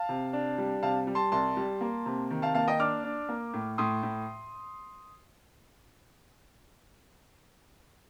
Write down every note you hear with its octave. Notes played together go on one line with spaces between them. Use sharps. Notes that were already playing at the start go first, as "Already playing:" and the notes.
Already playing: F5 A5
C3
D4
G3
C3 F5 A5
G3
A5 C6
C2 A5 C6
G3
A#3
C3
D#3
F5 A5
A#3 F5 A5
D#5 G5
D4 D6 F6
D4
A#3
A2
A2 C6 D#6
A2